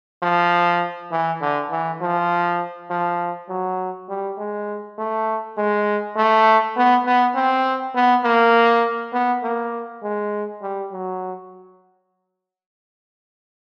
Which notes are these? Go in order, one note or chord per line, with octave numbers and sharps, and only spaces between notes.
F3
E3
D3
E3
F3
F3
F#3
G3
G#3
A3
G#3
A3
B3
B3
C4
B3
A#3
B3
A#3
G#3
G3
F#3